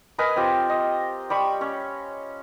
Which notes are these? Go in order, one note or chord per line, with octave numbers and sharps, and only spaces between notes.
A#4 B4 D#5 G#5
C4 F4 G4
D#5
G3 B5 C#6
C#4 C#5